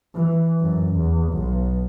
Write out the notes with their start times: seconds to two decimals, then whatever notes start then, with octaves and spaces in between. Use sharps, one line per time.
0.15 E3
0.60 F#2
0.96 E2
1.33 B1